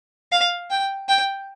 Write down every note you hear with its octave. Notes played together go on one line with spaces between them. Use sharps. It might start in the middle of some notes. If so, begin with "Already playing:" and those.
F5
G5
G5